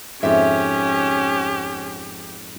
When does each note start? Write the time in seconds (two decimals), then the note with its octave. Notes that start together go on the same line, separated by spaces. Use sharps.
0.23 F2 G#2 C#4 G4 E5